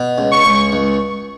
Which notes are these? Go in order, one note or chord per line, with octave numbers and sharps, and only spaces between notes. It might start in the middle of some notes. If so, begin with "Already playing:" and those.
Already playing: B2
C#2
C#6
C#2
C#2